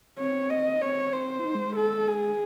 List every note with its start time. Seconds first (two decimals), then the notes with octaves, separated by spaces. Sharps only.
0.18 C4 C#5
0.50 D#5
0.82 C4 C#5
1.13 C5
1.39 E4
1.45 D#4
1.55 G#3
1.66 G#3
1.76 A4
2.08 G#4